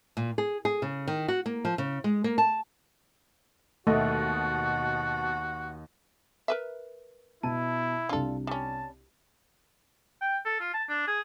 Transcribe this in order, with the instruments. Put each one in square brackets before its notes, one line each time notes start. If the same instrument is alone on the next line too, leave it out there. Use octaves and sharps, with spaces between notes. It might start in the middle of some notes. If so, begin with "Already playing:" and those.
[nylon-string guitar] A#2
G#4
G#4
C#3
D#3
F#4
A#3
F3
C#3
G#3
A#3
A5
[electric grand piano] D#2 D#5 [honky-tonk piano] B2 [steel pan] A3 [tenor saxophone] F#4
[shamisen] A#4 B4 E5
[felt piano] B2 A5 D#7 [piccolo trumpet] E4
[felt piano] C2 D4 [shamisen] F4 A4
[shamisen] G3 C#4 [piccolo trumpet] A5
[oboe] G5
A4
F4
A5
D4
G#4